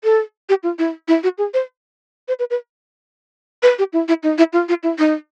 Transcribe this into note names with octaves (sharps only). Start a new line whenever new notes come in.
A4
G4
F4
E4
E4
F#4
G#4
C5
C5
B4
B4
B4
G4
E4
E4
D#4
E4
F4
F4
E4
D#4